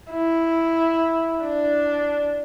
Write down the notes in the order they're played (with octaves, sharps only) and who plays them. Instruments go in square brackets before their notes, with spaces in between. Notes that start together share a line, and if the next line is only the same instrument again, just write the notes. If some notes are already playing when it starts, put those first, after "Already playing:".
[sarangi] E4
D4